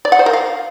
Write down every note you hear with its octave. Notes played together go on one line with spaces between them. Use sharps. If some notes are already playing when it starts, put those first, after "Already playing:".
D5
F#5
C5
A#4
F5